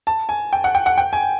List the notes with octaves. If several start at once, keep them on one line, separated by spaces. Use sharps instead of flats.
A5
G#5
G5
F#5
G5
F#5
G5
G#5